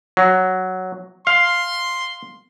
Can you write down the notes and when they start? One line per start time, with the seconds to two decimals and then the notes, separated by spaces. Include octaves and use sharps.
0.17 F#3
1.27 F5 C6